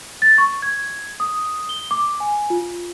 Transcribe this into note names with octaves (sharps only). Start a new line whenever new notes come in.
A6
C#6
G#6
D#6
G7
D6
G#5
F4